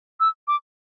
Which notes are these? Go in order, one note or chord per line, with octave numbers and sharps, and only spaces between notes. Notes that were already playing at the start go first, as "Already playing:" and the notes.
E6
D6